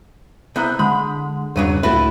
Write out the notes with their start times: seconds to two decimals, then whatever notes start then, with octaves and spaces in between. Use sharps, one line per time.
0.56 C2 B3 E4 A#5 F#6 G6
0.79 D3 G#3 B5
1.56 E2 G2 A#2 C#3 F#3 D#7
1.83 C#2 A2 A3 E4 F#4 A4 B4